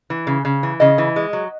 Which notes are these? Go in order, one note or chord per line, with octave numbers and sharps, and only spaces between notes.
E3
C#3
C#3
E3
C#3 D#5
E3
G#3
F#3